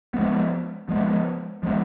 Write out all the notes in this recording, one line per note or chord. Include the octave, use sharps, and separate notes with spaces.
F3 G#3 B3
F3 G#3 B3
F3 G#3 B3